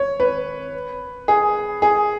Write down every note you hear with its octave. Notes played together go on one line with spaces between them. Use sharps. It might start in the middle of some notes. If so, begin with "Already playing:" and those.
Already playing: C#5
B4
G#4
G#4